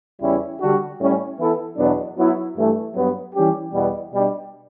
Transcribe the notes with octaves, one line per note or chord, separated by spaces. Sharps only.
E2 C#3 G3 C#4 E4
D3 G3 D4 F#4
A2 G3 C#4
E3 B3 E4 A4
E2 B2 F#3 B3 D4
F#3 B3 E4
G2 E3 A3
G2 F#3 B3
E3 G3 C#4 G4
E2 B2 G3 B3
B2 G3 D4